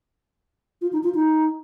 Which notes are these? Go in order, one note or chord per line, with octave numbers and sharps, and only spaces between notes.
F4
D#4
F4
D#4